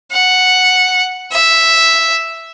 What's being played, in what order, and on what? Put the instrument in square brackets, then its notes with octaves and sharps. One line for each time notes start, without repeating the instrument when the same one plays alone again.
[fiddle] F#5
E5